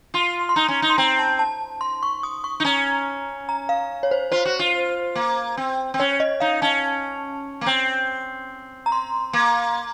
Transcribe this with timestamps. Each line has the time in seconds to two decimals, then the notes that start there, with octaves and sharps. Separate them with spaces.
0.14 F4 C6
0.49 C6
0.56 D#4 A#5
0.68 C#4
0.82 D#4
0.90 C6
0.98 C4 A#5
1.19 A5
1.39 A5
1.81 C6
2.03 C#6
2.23 D#6
2.44 C#6
2.60 D#4
2.65 C#4 A#5
3.49 A#5
3.69 F5
4.03 C#5
4.11 C5
4.32 F4 C5
4.45 F#4
4.59 F4
5.15 A#3
5.57 C4
5.94 C4
6.00 C#4 C#5
6.20 D#5
6.40 D#4 F5
6.62 C#4 A5
7.61 A#3
7.66 C4
8.86 A#5
8.92 C6
9.33 A#3